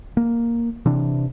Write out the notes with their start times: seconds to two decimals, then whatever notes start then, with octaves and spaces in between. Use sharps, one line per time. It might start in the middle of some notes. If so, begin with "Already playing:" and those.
0.17 A#3
0.86 C3 E3 D4